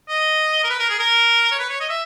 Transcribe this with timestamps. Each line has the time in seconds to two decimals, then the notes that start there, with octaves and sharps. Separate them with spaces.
0.09 D#5
0.64 A#4
0.70 B4
0.79 A#4
0.89 G#4
0.99 A#4
1.51 C#5
1.59 B4
1.70 C#5
1.80 D#5
1.89 E5